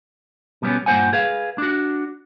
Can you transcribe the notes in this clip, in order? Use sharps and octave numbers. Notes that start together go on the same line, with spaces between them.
B2 G3 B3 C#4
G2 A#2 A#3 C5 F#5 G#5
G#4 B4 F5
D4 F#4